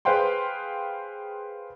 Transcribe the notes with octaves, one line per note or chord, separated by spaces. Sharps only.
G#4 B4 C5 F5 G5 C6